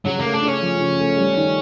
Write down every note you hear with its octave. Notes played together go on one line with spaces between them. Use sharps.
C#3 F#3
A3 A#3
D4
C#3 C#4
F3
C#3
A3
G3
D#3